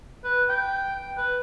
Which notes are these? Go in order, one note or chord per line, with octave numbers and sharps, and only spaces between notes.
B4
G5
B4